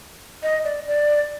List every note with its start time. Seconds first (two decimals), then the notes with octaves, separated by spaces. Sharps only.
0.43 D#5
0.64 D5
0.88 D5